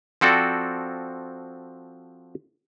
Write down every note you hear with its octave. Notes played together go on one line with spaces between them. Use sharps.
F3 C4 F#4 A4 D5